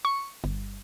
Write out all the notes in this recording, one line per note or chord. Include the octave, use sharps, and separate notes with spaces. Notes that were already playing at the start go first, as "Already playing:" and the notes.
C#6
G1